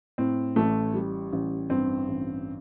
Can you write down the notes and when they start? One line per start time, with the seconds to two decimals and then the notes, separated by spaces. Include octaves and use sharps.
0.18 A2 C4
0.56 A1 A3
0.94 G3
1.32 A1
1.70 G2 C4
2.08 A1